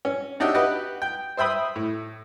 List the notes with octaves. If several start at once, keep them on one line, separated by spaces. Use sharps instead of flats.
C#4
D4 D#4 F#4 G4 E5
F#4 G4 B4 D#5
G5
C5 E5 G5 B5 D#6
A2